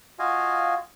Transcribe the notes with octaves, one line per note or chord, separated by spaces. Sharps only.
F4 F#4 D#5 F5 G#5